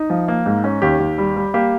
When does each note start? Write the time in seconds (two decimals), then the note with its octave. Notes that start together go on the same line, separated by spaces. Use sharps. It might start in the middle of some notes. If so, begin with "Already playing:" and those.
Already playing: D#4
0.10 F3
0.28 A#3
0.46 G#2
0.64 C#4
0.82 D#2 G4
1.00 D#2
1.18 G3
1.36 G3
1.54 A#3 G4